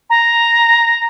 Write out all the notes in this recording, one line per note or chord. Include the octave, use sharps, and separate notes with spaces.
A#5